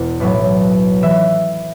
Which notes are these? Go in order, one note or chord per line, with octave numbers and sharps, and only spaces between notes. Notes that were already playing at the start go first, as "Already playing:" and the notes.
Already playing: E1 E2 B2
B1 A2 F#3 A3 B4
E3 E5